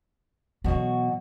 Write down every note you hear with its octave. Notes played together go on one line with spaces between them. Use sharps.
B2 E3 F#3 F#4